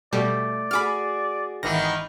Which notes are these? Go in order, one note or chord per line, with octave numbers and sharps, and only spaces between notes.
B2 G3 A3 D5
F#4 G#4 B5 D6 F6
G#1 D#3 E3 B3 A#6